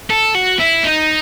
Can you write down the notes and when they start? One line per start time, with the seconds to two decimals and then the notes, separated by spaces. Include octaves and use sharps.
0.10 A4
0.35 F#4
0.59 E4
0.84 D#4